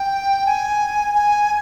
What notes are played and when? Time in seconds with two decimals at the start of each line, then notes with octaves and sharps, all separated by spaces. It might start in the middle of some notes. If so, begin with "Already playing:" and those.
Already playing: G5
0.46 G#5
1.14 G#5